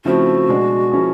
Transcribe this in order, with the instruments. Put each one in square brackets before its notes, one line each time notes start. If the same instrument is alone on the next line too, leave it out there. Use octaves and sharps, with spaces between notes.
[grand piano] C#3 F3 A3 C4 E4 [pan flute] F#4
[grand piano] B2 G#3 B3 D4
F3 A#3 C#4 E4 G#4